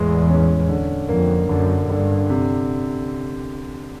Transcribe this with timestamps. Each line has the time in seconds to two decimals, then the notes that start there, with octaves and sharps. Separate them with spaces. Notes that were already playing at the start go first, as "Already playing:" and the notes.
Already playing: E2 A2 E3 G#3
0.29 C#4
0.69 D3
1.09 F2 A#3
1.49 F#2 D3
1.90 G2 D3
2.30 C3